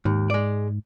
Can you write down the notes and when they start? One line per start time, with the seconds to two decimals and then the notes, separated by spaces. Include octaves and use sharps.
0.05 D#2 G#2
0.30 G#3 D5